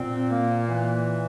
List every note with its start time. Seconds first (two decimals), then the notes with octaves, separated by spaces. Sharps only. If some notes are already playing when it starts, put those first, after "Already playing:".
Already playing: A#2 C4
0.30 A#3
0.68 E3